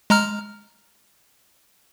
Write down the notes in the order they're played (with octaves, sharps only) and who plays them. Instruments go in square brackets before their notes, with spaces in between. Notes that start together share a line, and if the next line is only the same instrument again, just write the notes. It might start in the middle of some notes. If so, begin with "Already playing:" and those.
[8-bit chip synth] G#3 A#5 F6